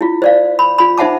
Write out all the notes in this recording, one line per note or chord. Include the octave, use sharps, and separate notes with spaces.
E4 F4
C5 D5 F5
B5
F4 B5
D#4 C5 E5 F#5 A5 D6